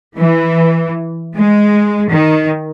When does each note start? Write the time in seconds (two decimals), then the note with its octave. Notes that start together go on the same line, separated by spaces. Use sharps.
0.17 E3
1.36 G#3
2.10 D#3